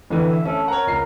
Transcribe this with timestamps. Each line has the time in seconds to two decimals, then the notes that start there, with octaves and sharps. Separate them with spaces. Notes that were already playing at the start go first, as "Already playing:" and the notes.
0.10 A1 D3 E3
0.28 E5
0.45 A3 C#4
0.68 A#4 C#5 F#5
0.87 C#2 C7